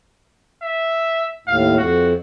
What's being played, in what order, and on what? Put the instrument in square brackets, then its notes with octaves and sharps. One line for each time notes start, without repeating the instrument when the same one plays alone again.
[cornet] E5
[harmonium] D#2 A2 [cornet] F5
[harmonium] F2 [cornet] F#4